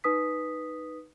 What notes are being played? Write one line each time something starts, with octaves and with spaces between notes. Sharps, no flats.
D#4 B4 D#6 B6